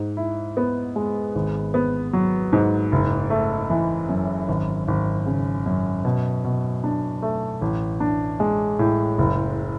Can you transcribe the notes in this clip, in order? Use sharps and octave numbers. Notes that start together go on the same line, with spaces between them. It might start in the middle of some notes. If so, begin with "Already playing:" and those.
Already playing: G#2
E4
B3
G#3
G#1
B3
F#3
G#2
F#1
A3
E3
F#2
G#1
G#1
C#3
F#2
B2
B2
D4
A3
A1
D4
G#3
A2
F#1